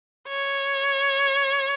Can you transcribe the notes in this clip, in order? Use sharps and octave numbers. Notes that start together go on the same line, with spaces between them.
C#5